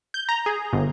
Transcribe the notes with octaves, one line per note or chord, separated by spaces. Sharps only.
G6
A#5
G#4
G1